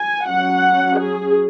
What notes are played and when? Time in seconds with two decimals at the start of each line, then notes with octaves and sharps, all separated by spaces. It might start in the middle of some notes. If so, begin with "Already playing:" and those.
Already playing: G#5
0.27 F#3 C#4 F#5
0.98 G#4